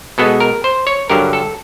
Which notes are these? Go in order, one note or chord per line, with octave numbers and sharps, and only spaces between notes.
B2 G#3 B3 A4
A#4
C5
C#5
G2 D3 F#3 A#4
A4